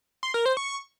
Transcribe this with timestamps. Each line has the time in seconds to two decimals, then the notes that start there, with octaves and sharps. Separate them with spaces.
0.23 C6
0.34 A#4
0.46 C5
0.57 C#6